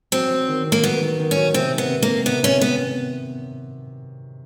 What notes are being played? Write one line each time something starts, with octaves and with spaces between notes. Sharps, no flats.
F#3 C4
F#3
D#3
D#3
A#3
F#3 B3
D#3
D#3
C#4
F#3
C3 C4
D#3
B3
C3
C3 A#3
C3 B3
C3 C#4
C3 B3